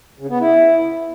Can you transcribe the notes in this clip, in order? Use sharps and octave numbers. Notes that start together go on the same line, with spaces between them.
C#3
B3
E4